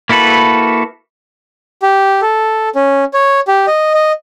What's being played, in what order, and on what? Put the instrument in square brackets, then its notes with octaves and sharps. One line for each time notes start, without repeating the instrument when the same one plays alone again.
[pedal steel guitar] A#3 E4 F#4 A4 B4
[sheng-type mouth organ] G4
A4
C#4
C#5
G4
D#5
D#5